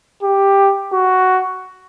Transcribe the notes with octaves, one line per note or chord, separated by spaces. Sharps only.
G4
F#4